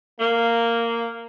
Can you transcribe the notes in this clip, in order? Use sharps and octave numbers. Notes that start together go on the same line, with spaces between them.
A#3